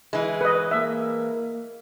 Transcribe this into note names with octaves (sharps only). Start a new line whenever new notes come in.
E3 G#3
B4 D#5
A#3 E5